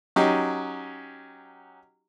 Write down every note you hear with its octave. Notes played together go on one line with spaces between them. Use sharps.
F#3 C#4 D#4 G4